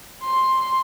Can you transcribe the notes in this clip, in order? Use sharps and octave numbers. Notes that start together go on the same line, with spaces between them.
C6